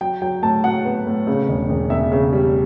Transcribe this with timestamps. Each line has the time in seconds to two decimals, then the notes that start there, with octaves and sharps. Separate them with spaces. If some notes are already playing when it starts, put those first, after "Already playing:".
0.01 F#3 G5
0.22 F#3 G5
0.43 A2 A5
0.64 F#3 F#5
0.85 B3
1.06 A2
1.27 C#3
1.49 E1
1.70 E1
1.90 E1 E5
2.12 C#3
2.33 G3